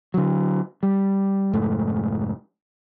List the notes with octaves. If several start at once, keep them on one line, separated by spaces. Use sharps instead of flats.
D3 F#3
G3
F1 G#2 A3